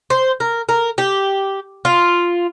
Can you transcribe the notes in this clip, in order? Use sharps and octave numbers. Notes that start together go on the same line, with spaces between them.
C5
A#4
A#4
G4
F4